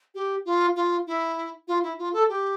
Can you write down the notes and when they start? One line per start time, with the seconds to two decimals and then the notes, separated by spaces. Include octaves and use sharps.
0.15 G4
0.45 F4
0.76 F4
1.07 E4
1.68 F4
1.83 E4
1.99 F4
2.13 A4
2.29 G4